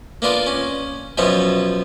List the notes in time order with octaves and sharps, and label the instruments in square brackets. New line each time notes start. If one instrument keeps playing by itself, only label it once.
[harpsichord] A#3 B3 D4 F4
C#4
F#2 B2 F3 B3 C#5